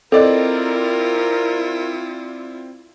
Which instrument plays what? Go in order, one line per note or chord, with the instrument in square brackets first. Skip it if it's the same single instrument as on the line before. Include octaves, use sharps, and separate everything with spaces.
[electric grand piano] C4 D5 [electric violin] E4 F4 [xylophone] A4 D#5 [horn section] A#4